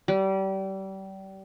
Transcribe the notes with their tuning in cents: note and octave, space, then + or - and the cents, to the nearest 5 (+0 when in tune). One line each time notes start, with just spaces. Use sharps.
G3 -30